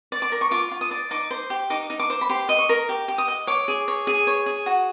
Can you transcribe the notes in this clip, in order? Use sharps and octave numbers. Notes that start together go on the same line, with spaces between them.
D5
D6
A#4
C#6
F4 D6
F4
D#6
D5
D#4 D6
C5
G4
D#4 D6
D#4
D6
C5
B5
G4 C6
D#5
C#6
A#4
G4
G4
D#6
D#5
C#5 D6
G#4
C#5
G#4
C#5
G#4
F#4